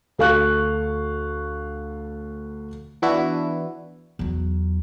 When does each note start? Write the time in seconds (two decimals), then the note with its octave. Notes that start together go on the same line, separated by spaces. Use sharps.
0.18 D2 A4 F5 C#6 F#6
3.02 E3 B3 D4 E4 F#4
4.19 E2 F#3